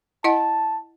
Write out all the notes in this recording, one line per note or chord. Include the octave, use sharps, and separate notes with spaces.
E4 D#5 F#5 A5